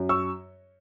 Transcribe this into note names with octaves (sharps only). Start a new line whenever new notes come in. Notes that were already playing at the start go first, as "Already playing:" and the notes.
Already playing: F#2
C#6 E6